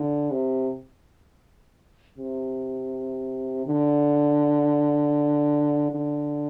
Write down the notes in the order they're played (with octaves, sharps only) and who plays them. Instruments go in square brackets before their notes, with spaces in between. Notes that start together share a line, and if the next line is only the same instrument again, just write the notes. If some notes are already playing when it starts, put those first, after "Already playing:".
Already playing: [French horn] D3
C3
C3
D3
D3